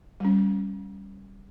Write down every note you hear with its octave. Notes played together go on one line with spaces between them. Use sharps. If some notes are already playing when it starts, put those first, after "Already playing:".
G3 C#4